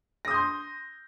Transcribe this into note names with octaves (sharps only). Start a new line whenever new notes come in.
C6 D#6 G6 A#6